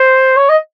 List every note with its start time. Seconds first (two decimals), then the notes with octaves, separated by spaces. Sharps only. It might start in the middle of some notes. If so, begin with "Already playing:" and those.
Already playing: C5
0.36 C#5
0.49 D#5